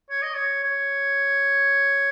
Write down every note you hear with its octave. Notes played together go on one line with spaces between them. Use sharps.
C#5
D#5
C#5
C#5